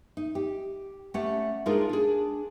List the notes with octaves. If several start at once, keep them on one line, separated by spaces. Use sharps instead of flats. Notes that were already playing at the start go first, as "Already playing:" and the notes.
D#4
G4
A3 C#4 G4 C#5 F#5
G#3 D4 D#4 F4 G#4 A#4
D4 G#4